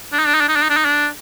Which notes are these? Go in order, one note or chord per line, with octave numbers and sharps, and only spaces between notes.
D4
D#4
D4
D#4
D4
D#4
D4
D#4
D4
D#4
D4